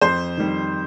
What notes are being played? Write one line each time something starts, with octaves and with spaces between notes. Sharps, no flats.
F2 C5 C6
D#3 G3